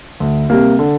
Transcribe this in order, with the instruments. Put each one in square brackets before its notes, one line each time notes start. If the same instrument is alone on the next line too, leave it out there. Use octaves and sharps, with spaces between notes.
[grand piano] D2
C3 G3 A#3
D3